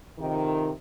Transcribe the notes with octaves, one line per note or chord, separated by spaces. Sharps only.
F2 C3 D#3